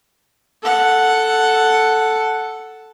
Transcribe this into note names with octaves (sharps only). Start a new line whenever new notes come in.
A4 F#5